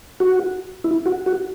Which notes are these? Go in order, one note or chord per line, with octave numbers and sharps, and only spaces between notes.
F#4
E4
F#4
F#4